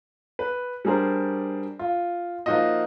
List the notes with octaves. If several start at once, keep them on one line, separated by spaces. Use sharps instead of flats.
B4
G3 D4 G#4 A#4 C5
F4
F3 A#3 D#4 F4 F#4 D#5